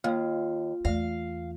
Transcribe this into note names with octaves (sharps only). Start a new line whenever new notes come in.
D#2 A#3 F4 D#5
E2 A3 D5 F5